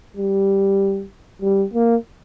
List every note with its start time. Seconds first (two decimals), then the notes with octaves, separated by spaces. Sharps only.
0.17 G3
1.42 G3
1.74 A#3